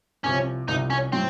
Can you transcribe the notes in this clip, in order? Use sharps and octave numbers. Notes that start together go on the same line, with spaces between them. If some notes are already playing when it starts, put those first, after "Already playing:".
C2 C3 F3 C#4
C2 C3 F3 D#4
C#4
A2 F#3 C4